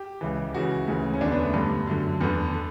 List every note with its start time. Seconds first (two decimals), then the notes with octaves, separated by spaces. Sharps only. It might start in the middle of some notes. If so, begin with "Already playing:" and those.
Already playing: G4
0.21 C#2 C#3 E3
0.54 C#2 C#3 E3 F#4
0.88 D2 C#3 E3
1.14 C#4
1.21 E2 D3 D4
1.32 B3
1.43 A3
1.54 G2 D3
1.87 F#2 D3
2.21 E2 D3 B3
2.54 D3